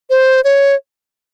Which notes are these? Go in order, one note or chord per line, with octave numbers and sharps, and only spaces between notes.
C5
C#5